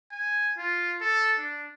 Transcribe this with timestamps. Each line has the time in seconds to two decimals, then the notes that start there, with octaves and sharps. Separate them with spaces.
0.11 G#5
0.58 F4
1.01 A4
1.38 D4